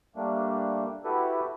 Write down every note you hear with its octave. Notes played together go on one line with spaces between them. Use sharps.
G3 A3 A#3 D4
E4 F#4 G4 A4 B4